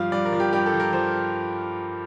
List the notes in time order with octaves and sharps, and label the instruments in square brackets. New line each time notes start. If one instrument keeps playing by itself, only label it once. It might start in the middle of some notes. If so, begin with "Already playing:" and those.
Already playing: [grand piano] G2 F3 F5
G2 D5
A#4
F3
G4
G2 G4
A4
F3
A#4
F3 C5